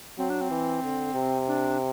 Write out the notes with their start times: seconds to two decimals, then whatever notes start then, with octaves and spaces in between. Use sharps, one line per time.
0.18 F#3 C4
0.30 D4
0.41 C4
0.51 E3
0.83 D3
1.15 C3
1.47 D4